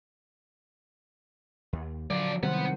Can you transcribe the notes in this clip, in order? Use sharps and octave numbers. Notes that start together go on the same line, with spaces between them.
D#2
D3 F3 F#3 D5
C3 D#3 G3 B3 C4 C5 F#5